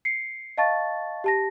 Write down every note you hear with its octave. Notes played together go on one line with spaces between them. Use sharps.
C7 C#7
D#5 F5 A5 C#6 A6
G4 A5 A#6